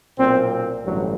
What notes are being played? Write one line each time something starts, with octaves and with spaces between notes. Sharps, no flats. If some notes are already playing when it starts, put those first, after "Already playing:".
B1 A#2 C4
A1 G2 D3 F#3